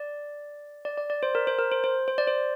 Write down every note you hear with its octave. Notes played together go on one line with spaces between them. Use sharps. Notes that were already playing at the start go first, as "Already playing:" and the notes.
Already playing: D5
D5
D5
D5
C5
A#4
C5
A#4
C5
C5
C5
D5
C5